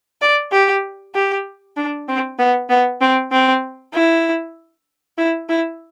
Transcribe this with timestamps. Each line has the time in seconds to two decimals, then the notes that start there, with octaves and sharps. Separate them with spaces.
0.22 D5
0.52 G4
1.15 G4
1.77 D4
2.08 C4
2.39 B3
2.70 B3
3.01 C4
3.32 C4
3.94 E4
5.18 E4
5.49 E4